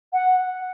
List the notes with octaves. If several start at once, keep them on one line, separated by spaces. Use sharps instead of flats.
F#5